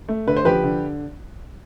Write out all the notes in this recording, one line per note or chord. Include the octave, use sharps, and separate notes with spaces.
A3
D3 B4
C5
F3 G4 B4
D3